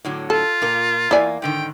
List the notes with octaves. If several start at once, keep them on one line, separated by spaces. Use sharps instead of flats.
A2 D3 F#3
F4 A4
A#2 A#4
E2 A#3 E4 D5 G#5
G#2 D3 D#3 G5